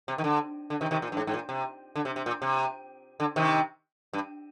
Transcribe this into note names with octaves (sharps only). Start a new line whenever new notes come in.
C3
D#3
D3
D3
C3 D#3
C3 D#3
A#2
G2
G#2
G#2
A#2
C3
D3
C3
C3
A#2
C3
D3
C3 D#3
G2